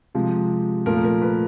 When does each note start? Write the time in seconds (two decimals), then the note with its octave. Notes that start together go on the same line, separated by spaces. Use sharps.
0.15 C3 F3 G#3
0.86 A#2 F3 A3 A#4
1.05 A#4
1.22 B4